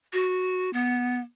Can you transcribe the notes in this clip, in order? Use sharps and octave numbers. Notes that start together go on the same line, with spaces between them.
F#4
B3